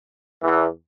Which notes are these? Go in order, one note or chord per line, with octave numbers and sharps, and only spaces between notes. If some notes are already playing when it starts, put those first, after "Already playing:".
E2 E3